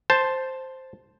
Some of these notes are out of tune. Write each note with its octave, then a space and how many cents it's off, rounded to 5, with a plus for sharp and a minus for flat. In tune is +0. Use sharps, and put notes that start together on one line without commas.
C5 +0 A5 +0